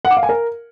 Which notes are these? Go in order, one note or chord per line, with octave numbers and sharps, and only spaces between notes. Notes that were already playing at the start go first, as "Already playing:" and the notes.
F#5
D6
F5
G#5
A#4